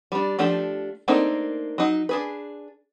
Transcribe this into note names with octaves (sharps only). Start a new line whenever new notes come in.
G3 D4
F3 A3 D4 G4
A3 A#3 C4 D4 D#4
F#3 D#4
D4 G#4 B4